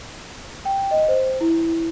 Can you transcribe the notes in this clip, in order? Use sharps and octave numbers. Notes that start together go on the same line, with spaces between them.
G5
D#5
C5
E4